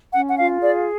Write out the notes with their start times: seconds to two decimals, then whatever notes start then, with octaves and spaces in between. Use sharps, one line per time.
0.14 C#4 F#5
0.29 F#5
0.39 F4 F5
0.62 G#4 D5